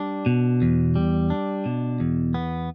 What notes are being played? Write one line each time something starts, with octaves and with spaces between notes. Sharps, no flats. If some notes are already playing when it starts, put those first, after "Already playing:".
Already playing: G3 D4
B2
E2
G3
D4
B2
E2
B3